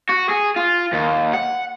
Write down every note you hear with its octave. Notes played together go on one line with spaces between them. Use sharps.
F#4
G#4
F4
D#2
F#5